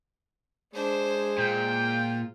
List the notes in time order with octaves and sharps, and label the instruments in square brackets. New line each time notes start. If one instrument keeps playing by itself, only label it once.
[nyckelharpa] G#3 [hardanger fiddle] D4 C5
[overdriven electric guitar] A#2 [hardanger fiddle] F4 [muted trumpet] G5